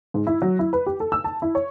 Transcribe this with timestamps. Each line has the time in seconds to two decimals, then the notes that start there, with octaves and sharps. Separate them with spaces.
0.14 G#2
0.27 E4
0.42 F#3
0.59 E4
0.73 B4
0.86 G4
1.00 A4
1.12 E6
1.24 A5
1.42 E4
1.55 C#5